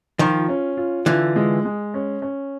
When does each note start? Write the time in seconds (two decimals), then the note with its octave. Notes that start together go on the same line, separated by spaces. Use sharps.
0.19 D#3 F3 F4
0.48 C#4
0.77 F4
1.06 D3 E3 F4
1.36 G#3
1.65 G#3
1.94 C#4
2.22 C#4